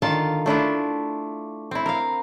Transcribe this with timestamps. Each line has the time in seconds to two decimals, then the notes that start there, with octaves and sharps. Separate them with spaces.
0.02 D3 D#3 F4 F5 A5
0.46 A3 D4 E4 F4
1.71 C4 E4
1.86 A#4 F5